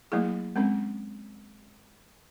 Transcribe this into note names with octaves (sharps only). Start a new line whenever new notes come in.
F#3 A3 A#3 E4 G#4
G#3 C4 C#4